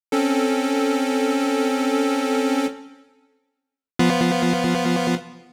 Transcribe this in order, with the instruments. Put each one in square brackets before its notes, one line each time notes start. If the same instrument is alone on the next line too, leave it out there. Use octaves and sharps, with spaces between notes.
[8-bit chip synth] C4 C#4 A4
F3 B3 F4